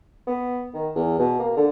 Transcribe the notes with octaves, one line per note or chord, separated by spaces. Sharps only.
B3
D#3
E2
B2
A#3
D3